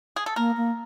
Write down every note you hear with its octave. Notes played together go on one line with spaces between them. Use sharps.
G#4
A4
A#3 A#4
A#3